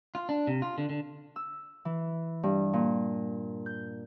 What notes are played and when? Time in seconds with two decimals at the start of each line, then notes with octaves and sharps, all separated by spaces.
0.15 F4
0.29 D4
0.47 C3
0.62 F4
0.78 D3
0.89 D3
1.36 E6
1.85 E3
2.43 G2
2.73 A#2
3.66 G6